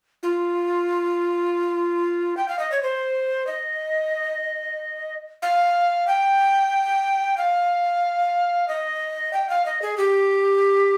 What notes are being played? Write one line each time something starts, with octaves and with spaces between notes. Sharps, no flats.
F4
G5
F5
D#5
C#5
C5
D#5
F5
G5
F5
D#5
G5
F5
D#5
G#4
G4